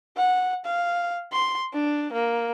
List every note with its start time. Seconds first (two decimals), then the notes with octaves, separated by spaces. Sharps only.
0.17 F#5
0.65 F5
1.32 C6
1.73 D4
2.13 A#3